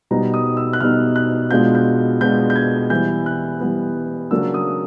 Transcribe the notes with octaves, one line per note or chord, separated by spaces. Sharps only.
B2 G3 B3 D#4 A#5
D#6
E6
F#6
B2 G3 B3 D#4 F6
F#6
B2 G#3 B3 D4 F4 G6
G6
B2 G#3 B3 D4 F4 G6
G6
G#6
E3 G3 B3 G6
F#6
E3 G3 B3
C#3 F#3 A#3 D4 E6
D#6